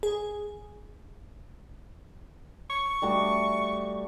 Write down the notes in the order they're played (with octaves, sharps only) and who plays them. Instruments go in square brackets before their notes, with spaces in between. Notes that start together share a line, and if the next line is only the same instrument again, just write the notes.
[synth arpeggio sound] G#4
[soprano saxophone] C#6
[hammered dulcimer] G3 A3 F#4